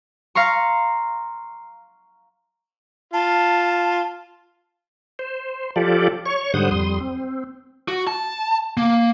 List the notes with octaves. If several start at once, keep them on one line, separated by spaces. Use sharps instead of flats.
F5 A#5 C6 C#6
F4 A5
C5
F3 F4 G4 A4 D5
C#5 C#6
G#2 D3 G3 C5 F#5 D#6
F2 G3 C6 D#6
C4
F#4
A5
A#3